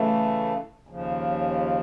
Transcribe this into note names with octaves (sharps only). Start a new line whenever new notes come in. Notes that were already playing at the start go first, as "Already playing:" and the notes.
Already playing: C#3 E3 A3
D#2 C#3 F3